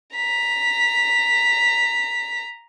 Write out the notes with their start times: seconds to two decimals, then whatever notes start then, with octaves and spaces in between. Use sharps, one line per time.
0.15 A#5 B6